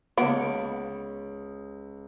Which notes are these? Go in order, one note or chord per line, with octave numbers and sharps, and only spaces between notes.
C#2 A#3 B3 C#5 D7